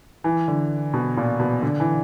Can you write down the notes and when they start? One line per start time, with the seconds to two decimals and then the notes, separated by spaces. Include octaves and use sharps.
0.24 E3
0.48 D3
0.94 B2
1.17 A#2
1.40 B2
1.62 D3
1.80 E3